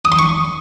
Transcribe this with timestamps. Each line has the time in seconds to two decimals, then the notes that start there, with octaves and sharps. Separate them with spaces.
0.05 D#6
0.12 C6
0.19 C#6